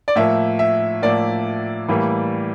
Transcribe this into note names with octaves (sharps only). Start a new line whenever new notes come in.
D5
A2 F3 A#3 E5
E5
A2 F3 A#3 D5
A2 E3 G3 A#3